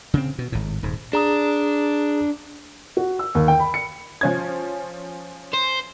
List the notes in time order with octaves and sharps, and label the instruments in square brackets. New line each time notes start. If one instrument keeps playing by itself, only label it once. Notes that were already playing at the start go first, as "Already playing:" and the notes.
[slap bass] C#3 C4
B2
G#1 A2
D#1 G#2
[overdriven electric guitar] D4 [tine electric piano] G#4 A#5 D#6
[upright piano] F#4
E6
D#2
G5
B5
C#7
[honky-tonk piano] F3 C#4 G#6
[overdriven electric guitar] C5